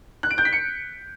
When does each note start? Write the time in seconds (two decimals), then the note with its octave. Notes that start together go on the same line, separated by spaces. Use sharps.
0.23 F#6
0.31 D7
0.38 G6
0.45 B6
0.53 C#7